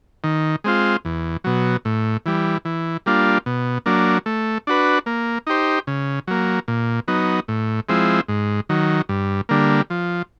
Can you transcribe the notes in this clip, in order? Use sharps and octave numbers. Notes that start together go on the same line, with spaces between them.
D#3
G#3 C4 F4
E2
B2 F#3
A2
E3 G3
E3
G3 A#3 D4 F4
B2
F#3 A#3 D4
A3
D4 F#4 B4
A#3
D#4 G4 C5
C#3
F#3 A#3
A#2
F#3 B3 D#4
A2
F3 G#3 C4 E4
G#2
D#3 F#3
G2
D3 G3 A#3
F3